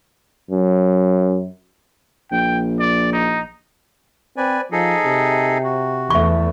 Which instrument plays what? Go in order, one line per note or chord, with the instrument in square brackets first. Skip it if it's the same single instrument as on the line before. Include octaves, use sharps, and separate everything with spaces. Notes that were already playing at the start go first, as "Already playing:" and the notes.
[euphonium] F#2
[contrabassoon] A#1 [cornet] G5
[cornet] D5
D#4
[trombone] C4 [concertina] B4 D5 G#5
[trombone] F3 [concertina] D#4 G#4 A4
[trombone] C3
[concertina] F#4
[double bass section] E2 E3 A3 [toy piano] E5 C#6